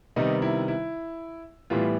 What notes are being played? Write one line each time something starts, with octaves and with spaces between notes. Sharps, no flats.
C3 D#3 G3 B3 D#4
E4
E4
A2 E3 G3 B3 F4